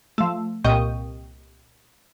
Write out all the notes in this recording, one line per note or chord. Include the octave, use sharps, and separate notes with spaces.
F3 A3
C2 A#2 D#5 G5 C#6 G6